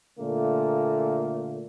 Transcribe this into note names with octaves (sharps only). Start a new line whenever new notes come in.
A#2 D3 A3 A#3